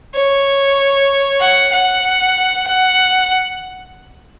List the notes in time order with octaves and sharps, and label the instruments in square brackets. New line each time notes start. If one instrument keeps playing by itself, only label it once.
[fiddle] C#5
F#5
F#5
F#5